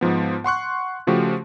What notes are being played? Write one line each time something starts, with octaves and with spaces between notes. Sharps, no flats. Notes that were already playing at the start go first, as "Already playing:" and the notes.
G#2 F3 B3
F#5 C6 C#6 F#6
C#3 F3 A3 F#4 G4